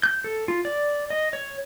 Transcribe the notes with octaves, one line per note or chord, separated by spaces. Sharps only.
G6
A4
F4
D5
D#5
C#5